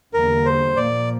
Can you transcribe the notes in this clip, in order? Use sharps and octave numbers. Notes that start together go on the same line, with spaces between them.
E2 D3 G3 A#3 A#4
C5
A#2 F3 A#3 D5